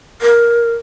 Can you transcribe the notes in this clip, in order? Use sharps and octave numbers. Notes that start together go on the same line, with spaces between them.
A#4